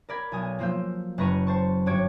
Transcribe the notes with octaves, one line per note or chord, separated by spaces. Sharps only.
A#4 D5 B5 G#6
B1 A4 G#5 D#6
F3 A#3 F4 E6 G6
F#1 B4 A#5 C#6 D#7
C5 A5 C#6
G1 F#4 C#5 D6 G#6